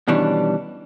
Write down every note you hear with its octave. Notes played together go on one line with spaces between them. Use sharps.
B2 D#3 E3 G3 C#4 D4